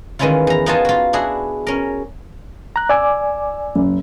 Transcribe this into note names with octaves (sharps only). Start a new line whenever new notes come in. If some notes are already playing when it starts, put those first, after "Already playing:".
D#3 E3 G#3 C#4 E4 F4
E2 A#5
B3 D#4 F4 F#4 G#5 A5
F4 F#4
D4 E4 F#4 G#4
C#4 A#4
A#5 F#6
D5 G#5 D6 E6
F#1